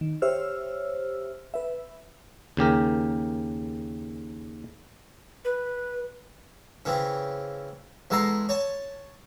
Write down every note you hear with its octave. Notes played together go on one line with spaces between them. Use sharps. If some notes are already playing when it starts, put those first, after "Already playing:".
D#3
G4 C5 C#5 E5 E6 F6
B4 E5
D#2 C#3 G4 A#4
B4
C#3 E3 C4
E2 G#3 A4 A#5 C6
C#5 A5